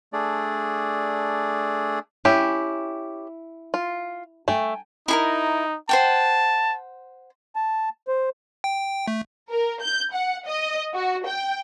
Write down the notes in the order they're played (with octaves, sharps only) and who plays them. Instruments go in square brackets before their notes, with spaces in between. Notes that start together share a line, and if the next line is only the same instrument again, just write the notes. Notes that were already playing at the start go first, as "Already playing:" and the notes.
[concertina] A3 D4 G#4 D5
[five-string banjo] C#4 G4 E5 [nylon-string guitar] E4
[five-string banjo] F4
[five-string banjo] A3 [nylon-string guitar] G5 G#5
[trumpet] D#4 [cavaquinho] E4 G#4 A#4
[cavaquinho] C5 F#5 G5 [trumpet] A5
[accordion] A5
C5
[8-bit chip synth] G5
A3
[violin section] A#4
G6
F#5
D#5
F#4
G5